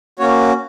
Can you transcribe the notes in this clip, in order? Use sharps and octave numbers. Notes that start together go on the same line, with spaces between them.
A#3 C#4 F#4 C#5